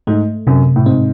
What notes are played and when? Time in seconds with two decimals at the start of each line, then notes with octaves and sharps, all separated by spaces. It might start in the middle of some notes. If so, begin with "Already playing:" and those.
0.07 G#2 A3
0.47 F#2 C3
0.76 A2
0.86 G#2 C4